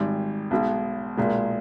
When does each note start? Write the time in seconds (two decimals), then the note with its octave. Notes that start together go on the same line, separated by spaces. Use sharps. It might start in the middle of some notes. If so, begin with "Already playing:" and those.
Already playing: G#1 G#2 G3
0.51 B1 B2 G#3
1.17 B1 A#2 G#3